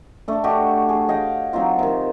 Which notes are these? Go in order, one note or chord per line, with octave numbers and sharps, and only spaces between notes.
A3 D4
D4 F#4 G4 D#5
G#4
C#5 D#5 F5 G5
F#3 C4 D#4 F4
C3 D#3